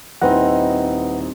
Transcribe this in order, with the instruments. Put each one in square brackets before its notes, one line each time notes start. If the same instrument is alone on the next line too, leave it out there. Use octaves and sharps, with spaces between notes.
[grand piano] D#1 D#4 E4 [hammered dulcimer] C4 D#5 [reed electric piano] B4 F#5